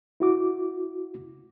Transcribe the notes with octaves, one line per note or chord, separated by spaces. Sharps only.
E4 F#4 D6